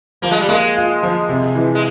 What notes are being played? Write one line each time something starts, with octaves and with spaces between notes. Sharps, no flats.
F3 A#3
G#3
G3
G#3 A#3
F4
F3
C3
E3
G#3